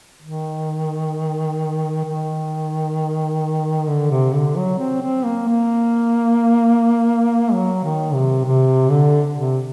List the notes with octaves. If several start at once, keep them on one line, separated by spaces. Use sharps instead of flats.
D#3
D#3
D3
C3
D3
F#3
C4
C4
A#3
A#3
F#3
D#3
C3
C3
D3
C3